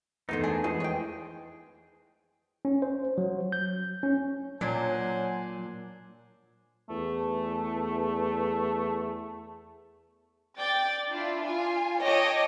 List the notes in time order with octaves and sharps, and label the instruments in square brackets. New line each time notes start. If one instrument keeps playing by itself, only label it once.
[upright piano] E2 [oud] D#3 A3 B3 [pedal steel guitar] D#4 C5
[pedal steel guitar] D4 [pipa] G#4
[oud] F2 C4 [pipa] B2 [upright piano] E3 G#3 [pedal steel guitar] G#4
[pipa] C#5 G5
[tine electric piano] C#4
C5
F#3
G6
C#4
[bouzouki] A#2 D4 [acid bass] F#3 [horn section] C5 F#5 G#5
[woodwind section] E2 A3
[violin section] D5 G5 A6
D4 E4 F4
F4 G#5
C#5 D#5 G5 A5 D6